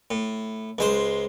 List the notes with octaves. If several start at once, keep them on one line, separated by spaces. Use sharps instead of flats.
A2
C#2 G#3 C5